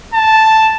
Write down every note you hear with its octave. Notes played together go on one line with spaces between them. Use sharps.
A5